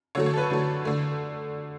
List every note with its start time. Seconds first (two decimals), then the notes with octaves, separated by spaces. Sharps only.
0.15 D3 F#3 A3 C#5
0.26 C#5
0.33 A4
0.38 B4
0.50 D3 F#3 A3
0.85 D3 A3